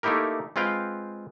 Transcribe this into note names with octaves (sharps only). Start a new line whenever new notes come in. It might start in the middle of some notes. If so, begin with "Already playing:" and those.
A3 A#3 D#4 E4 G4 A#4
G#3 C4 F4 B4 F5 G5